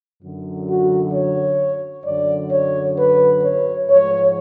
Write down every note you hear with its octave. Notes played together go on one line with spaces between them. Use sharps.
F#2 D3 F#3
F#4
C#5
F#2 D3 F#3 D5
C#5
B4
C#5
G#2 F3 G#3 C#5